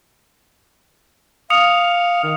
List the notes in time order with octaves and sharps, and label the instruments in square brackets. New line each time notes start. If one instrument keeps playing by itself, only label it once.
[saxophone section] F5 [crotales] D#6 C#7 F7
[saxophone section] D#3